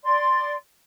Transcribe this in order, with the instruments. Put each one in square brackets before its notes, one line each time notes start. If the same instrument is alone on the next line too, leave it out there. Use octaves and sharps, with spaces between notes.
[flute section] D5 C6